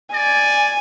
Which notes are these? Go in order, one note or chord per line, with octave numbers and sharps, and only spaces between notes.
D5 G#5